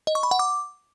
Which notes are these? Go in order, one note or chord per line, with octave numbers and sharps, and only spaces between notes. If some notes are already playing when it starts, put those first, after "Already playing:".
D#5
C#6
B5
F#5
D6